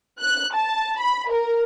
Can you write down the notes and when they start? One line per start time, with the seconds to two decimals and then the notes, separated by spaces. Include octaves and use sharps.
0.20 F#6
0.55 A5
0.99 B5
1.30 A#4